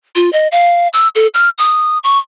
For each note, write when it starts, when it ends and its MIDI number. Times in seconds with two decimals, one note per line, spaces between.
0.16 0.32 65
0.33 0.48 75
0.52 0.88 77
0.93 1.08 88
1.15 1.27 69
1.34 1.49 89
1.58 1.98 87
2.04 2.18 85